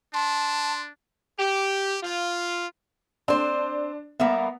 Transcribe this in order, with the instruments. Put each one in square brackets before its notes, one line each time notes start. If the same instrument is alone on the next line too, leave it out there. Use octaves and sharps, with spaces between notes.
[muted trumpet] D4 [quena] A5 [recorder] C6
[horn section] G4
F4
[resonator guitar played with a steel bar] C4 C5 [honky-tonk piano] D4
[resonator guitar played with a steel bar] G3 A#3 E5 [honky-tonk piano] B3